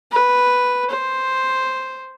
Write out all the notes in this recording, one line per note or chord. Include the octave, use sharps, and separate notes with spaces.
B4
C5